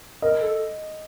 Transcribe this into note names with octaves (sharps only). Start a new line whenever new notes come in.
A#4 D#5
A4